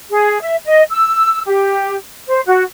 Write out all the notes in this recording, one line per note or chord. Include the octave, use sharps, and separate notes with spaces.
G#4
E5
D#5
E6
G4
C5
F#4